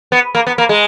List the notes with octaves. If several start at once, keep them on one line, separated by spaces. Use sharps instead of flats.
B3
A#3
B3
A#3
G#3